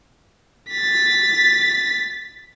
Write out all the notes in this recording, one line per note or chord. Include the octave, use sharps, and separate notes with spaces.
A6 B6